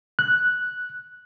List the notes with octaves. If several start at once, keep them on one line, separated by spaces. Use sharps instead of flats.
F#6